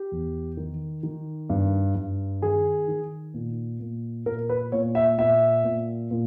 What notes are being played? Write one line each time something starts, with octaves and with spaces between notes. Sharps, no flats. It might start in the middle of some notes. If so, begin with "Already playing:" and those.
Already playing: G4
E2
D#3
D#3
G2
G2
D#3 G#4
D#3
A#2
A#2
A#2 A#4
B4
A#2 C#5
E5
A#2 E5
A#2
A#2